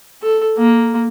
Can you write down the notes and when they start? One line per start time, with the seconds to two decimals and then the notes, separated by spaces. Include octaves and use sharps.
0.22 A4
0.58 A#3